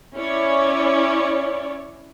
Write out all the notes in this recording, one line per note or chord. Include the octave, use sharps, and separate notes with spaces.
C#4 E4 C#5 D5